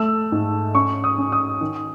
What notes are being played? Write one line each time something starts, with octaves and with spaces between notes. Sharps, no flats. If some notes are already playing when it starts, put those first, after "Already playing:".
Already playing: A3 E6
G#2
C#4 C#6
D#6
C#4
D#6
D#3